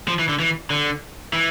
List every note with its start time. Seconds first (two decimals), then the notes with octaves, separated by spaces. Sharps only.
0.08 F3
0.19 E3
0.29 D3
0.39 E3
0.70 D3
1.33 E3